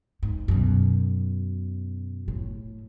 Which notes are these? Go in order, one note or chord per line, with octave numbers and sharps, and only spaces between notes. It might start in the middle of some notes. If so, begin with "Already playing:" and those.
G#2
F#2 B2
A2